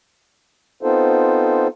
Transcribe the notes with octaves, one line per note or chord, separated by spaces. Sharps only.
B3 C4 D#4 F4 A4 C5